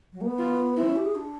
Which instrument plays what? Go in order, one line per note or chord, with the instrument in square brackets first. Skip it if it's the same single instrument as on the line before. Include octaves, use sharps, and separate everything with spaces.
[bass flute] F#3
A#3
B3
[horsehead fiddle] F4
[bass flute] C4 [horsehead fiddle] E4
[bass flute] C#4
G4
G#4
D4